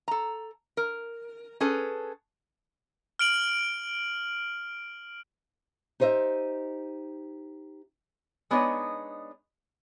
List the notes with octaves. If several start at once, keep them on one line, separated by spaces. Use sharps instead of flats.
A4 A#5
A#4
C#4 G#4 A4 B4
F6 D7 F#7
D#4 G4 C5 D#5 E5
G#3 B3 D4 D#4 C#5 D#5